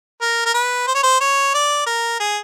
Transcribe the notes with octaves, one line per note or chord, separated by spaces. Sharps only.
A#4
A#4
B4
C5
C#5
C5
C#5
D5
A#4
G#4